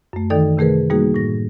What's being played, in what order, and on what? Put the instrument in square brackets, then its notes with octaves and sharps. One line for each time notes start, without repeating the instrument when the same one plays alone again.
[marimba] F#2 A3
D#3 E3 D#4 A4 D5 G5
C3 D#3 A3 G#4 A#4 B4
G3 A#3 D#4 F#4 G#4
A2 A#6